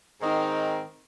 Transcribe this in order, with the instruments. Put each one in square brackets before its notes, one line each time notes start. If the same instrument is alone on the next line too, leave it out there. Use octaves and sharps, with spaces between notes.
[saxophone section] G#2 D#3 C4 D#4 A#4